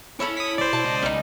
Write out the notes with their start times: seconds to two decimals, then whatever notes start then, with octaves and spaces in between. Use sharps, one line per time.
0.20 C#4 E4 A4 C#5 B5
0.37 D#6 B6
0.58 D1 C5 D5
0.73 B2 A5
0.85 C#2 D#5
1.02 C2 G3 D#4